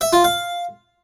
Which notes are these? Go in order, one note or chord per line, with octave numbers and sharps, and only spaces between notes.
E5
F4
F5